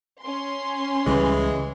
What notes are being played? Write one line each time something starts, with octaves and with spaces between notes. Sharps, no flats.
C#4 C6
C#2 E3 G3 G#3